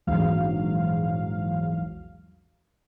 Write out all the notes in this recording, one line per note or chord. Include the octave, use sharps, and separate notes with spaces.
A#1 E2 G#2 F#3 F5